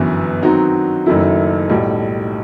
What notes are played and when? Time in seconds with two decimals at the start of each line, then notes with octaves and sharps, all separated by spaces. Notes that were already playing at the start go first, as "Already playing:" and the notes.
Already playing: G1 F#2 E3 B3
0.43 D#3 F#3 C4 D#4 F#4
1.06 F#1 F#2 D#3 A3 E4
1.70 B1 A2 G3